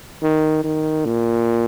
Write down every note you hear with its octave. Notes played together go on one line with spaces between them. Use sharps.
D#3
D#3
A#2